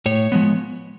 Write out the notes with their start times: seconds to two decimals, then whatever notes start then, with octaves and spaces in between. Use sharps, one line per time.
0.06 A2 C#5
0.32 F3 G#3 B3